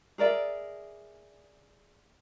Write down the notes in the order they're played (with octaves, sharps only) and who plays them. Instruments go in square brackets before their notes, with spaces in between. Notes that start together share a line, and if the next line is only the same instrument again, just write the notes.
[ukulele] G#4 A#4 D5 E5